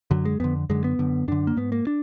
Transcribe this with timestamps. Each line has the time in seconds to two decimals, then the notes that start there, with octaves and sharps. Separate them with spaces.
0.11 F#2 D3 F#3
0.25 G#3
0.40 F2 D3 B3
0.70 F#2 D3 G#3
0.84 B3
0.99 F#2 D3
1.28 F#2 D3 D4
1.47 A#3
1.57 G#2 B3
1.72 A#3
1.87 D4